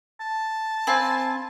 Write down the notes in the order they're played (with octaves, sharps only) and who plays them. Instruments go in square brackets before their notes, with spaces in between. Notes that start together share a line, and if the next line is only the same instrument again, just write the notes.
[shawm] A5
[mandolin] C4 G#5 [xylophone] C5 F5 B5